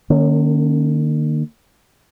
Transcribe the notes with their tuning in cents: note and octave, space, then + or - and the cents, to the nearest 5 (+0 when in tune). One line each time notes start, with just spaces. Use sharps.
D#3 -45 A#3 -10 C#4 +0